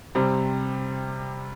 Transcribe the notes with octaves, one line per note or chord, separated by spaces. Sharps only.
C3 G3 C4